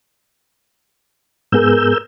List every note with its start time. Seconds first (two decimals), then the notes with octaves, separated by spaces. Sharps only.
1.52 G#2 B3 G#4 A#4 E6 G6